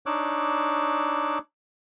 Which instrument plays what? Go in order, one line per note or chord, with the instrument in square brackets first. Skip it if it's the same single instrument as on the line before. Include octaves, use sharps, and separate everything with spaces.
[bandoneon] D4 D#4 C#5 D6 E6 F#6